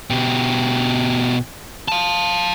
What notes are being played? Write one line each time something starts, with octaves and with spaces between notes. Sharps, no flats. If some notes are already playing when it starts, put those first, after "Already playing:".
B2 G4
F5 A5